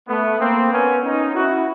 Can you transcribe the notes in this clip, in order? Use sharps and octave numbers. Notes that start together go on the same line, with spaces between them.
A3 B3
A#3 C4
B3 C#4
C#4 D#4
E4 F#4